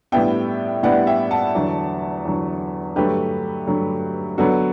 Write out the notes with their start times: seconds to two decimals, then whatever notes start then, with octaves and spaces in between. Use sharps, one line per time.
0.12 A2 G3 B3 D4 E5 G5
0.83 A2 G3 B3 D4 D5 F#5
1.07 E5 G5
1.31 F#5 A5
1.55 E2 D3 F#3
2.25 E2 D3 F#3
2.96 G2 D3 F#3 A3 G4 B4
3.67 G2 D3 F#3 A3
4.38 D3 F#3 B3 D4 F#4 A4